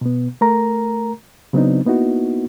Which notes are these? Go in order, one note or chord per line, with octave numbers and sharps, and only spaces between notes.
B2 B3
A3 A#4 A#5
C#3 F#3 B3 C4 D4 D#4
A#3 B3 D#4 E4 F#4